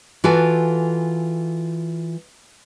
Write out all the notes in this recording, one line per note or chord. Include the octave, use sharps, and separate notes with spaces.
E3 F4 F#4 A4 G#5